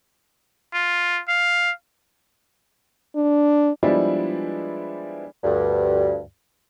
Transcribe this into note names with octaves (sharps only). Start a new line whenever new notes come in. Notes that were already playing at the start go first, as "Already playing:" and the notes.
F4
F5
D4
F3 G3 G#3 B3 D4 E4
D2 G2